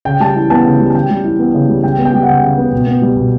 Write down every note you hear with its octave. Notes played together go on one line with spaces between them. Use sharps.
C#3 G5
G3 A5
E3
B3 A5
C#3
G3
A5
C#3 G5
G3
E3
B3
C#3
G3
C#3 G5
B3
G5
G3
F#5
C#3 G5
C#3
B3
B2
B3
G3
B2